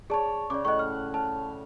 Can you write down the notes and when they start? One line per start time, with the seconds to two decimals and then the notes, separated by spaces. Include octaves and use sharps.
0.10 G#4 C#5 D5 A5
0.50 C#3 D5 D6
0.65 A2 D#5 F#5 C#6
0.79 F6
1.14 F5 A5